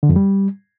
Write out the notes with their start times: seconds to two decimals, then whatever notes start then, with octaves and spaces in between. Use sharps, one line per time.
0.03 D3
0.09 F2
0.16 G3